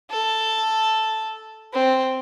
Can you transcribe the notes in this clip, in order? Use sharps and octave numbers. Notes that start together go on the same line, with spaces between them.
A4
C4